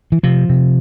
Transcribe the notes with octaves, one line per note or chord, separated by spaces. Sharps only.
E3
C3 F3
C3